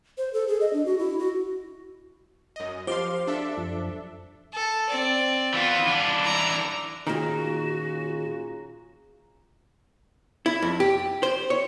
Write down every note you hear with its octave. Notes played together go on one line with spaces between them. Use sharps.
C5
A4
G#4
D#5
D4
F#4
E4
F#4
F#2 D#5
F3 G4 C5 F5 C6 D6
D4 A4 E5
F#2 F3
A4
C4 D5
E3 B3 F4
E3 D4
E4 A#5
A#2 D#3 C#4 F4 F#4 G#4 A#5
E4
F2
G4
C5
C#5